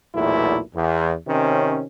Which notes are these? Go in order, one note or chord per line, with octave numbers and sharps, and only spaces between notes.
B1 E2 A#2 A3 E4
E2
C3 D#3 C#4